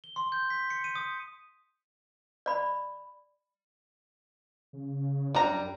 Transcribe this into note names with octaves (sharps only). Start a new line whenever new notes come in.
G7
C6
G6
B6
C#7
D#7
D#6
D5 B5
C#3
F#2 G3 D4 A#5